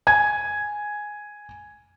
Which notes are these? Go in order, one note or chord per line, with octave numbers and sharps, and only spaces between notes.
G#5 G#6